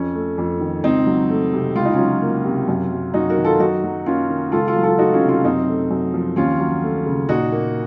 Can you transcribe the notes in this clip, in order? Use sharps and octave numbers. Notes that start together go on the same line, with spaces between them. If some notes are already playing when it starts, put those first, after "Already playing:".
Already playing: F2 C#4
A3
F2
D#3
C#2 C4 D#4
F#3
A3
C3
C#2 F4
D#4
C#4 F4
F#3
A#3
C3
F#2
F#3
F#2 D#4 F#4
F#4 A#4
D#3
F4 A4
F#2 D#4 F#4
F#3
A#3 C#4 F4
D#3
C#2 F4 A4
F4 A4
F#3
F4 A4
A3 D#4 F#4
C#4 F4
C3
C#4 F4
F#2 C4 D#4
A3
F#2
F3
D#2 C#4 F4
F#3
A3
C#3
A#2 D#4 F#4
A#3